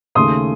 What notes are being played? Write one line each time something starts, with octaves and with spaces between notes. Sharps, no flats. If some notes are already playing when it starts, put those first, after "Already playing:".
D#2 C#3 A3 C6 D#6